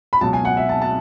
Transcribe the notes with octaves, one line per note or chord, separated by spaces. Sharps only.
B5
C#2 B2 F#3 A5
G#5
F#5
E5
A5
A5